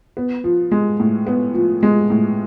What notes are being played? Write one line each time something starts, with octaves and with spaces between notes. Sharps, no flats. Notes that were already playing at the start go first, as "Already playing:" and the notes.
B3
F3
G#3
A2
B3
F3
G#3
A2